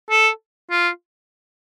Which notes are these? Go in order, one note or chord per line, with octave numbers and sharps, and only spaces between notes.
A4
F4